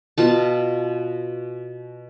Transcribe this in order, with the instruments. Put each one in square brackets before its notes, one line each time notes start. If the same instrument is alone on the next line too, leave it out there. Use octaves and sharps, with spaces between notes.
[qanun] B2 F4 A5